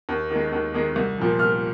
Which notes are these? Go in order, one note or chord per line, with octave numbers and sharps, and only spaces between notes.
D#2
D#3 G#3
D#2
D#3 G#3
C2
A#2 F3
C2 F6